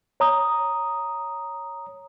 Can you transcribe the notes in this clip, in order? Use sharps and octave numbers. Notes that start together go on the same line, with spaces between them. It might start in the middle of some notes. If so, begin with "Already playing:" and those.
C#5 A#5 D#6